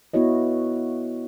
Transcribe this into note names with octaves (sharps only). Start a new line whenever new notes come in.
B3 E4 F#4 C#5 D#5